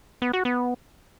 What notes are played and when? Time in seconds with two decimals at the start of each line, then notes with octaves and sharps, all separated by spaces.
0.22 B3
0.33 F#4
0.45 B3